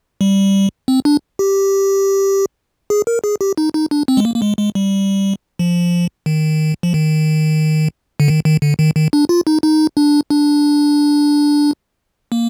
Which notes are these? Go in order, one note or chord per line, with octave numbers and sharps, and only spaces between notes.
G3
C4
D4
G4
G#4
A#4
G#4
G4
D#4
D#4
D4
C4
G#3
A#3
A#3
G#3
G#3
G3
F3
D#3
F3
D#3
D3
D#3
D#3
D3
D#3
D#3
D4
F4
D#4
D#4
D4
D4
A#3